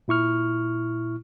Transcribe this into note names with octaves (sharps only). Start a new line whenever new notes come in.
A#2 E4 C#6 F6